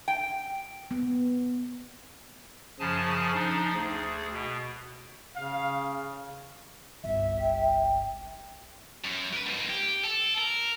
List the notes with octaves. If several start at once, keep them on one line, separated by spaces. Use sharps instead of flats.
G5
B3
F#2 C#3 F3 G#4 G#5 A5
F3 D4 D#4
D2 G#4
B2
C#3 F5
G1 C2 E5
G5
F#2
A#4 B4
G#2 A#3
G4
A4
A#4